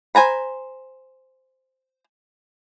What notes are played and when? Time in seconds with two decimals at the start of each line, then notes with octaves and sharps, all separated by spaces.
0.15 C5 G#5 A#5 B5